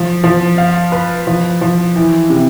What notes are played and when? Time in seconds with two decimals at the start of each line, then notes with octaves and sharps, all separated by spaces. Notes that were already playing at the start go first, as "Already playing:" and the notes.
Already playing: F3
0.24 F3
0.58 F5
0.92 B4
1.27 F3
1.61 F3
1.96 E3
2.30 C3